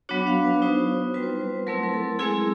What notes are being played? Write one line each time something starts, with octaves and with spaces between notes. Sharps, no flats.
F#3 B3 D4 F#4 C#5
F5
B4
B3 D#4 F#4 C5
G3 C4 F4 B4
C5
B4
F#3 A3 C4 E4 A#4
A#4
A4
G#3 C4 E4 G#4